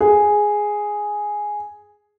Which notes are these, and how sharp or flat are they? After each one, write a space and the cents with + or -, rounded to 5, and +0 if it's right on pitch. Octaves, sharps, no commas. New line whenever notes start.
G#4 +0